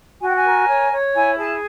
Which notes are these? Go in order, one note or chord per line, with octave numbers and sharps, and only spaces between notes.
F#4 G#5
G5
G#5
A#4
C#5
C#5
E4 G#5
G#4 A5